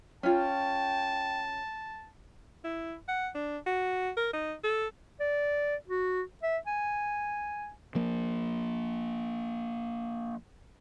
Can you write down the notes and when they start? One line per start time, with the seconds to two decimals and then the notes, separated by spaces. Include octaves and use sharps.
0.23 C#4 F4 G5 A5
2.64 E4
3.08 F#5
3.35 D4
3.66 F#4
4.17 A#4
4.33 D#4
4.64 A4
5.20 D5
5.88 F#4
6.43 E5
6.67 G#5
7.95 F3 A#3